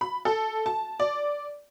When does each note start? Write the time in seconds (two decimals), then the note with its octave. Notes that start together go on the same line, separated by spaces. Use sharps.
0.01 B5
0.25 A4
0.66 A5
1.00 D5